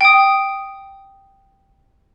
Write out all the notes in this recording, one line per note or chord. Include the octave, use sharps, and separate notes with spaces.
G5 D#6